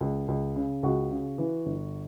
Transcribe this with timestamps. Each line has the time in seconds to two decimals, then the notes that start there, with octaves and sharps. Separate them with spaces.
0.01 C#2
0.28 C#2
0.56 C#3
0.83 C#2 F#4
1.11 C#3
1.38 E3
1.66 G1